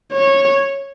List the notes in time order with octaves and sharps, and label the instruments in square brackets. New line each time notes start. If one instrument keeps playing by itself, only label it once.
[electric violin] C#5